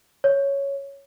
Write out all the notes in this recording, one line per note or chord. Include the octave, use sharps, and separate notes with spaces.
C#5